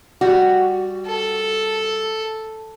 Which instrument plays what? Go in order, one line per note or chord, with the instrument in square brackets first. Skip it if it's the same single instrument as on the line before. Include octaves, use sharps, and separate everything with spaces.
[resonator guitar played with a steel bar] G3 F#4
[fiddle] A4